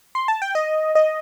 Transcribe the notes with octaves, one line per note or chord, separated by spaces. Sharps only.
C6
A5
G5
D#5
D#5